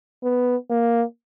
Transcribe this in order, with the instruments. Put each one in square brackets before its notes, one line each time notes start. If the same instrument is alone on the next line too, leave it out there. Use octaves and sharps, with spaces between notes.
[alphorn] B3
A#3